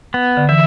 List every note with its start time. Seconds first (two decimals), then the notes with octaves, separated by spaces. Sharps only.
0.14 B3
0.37 D3
0.49 E3 E5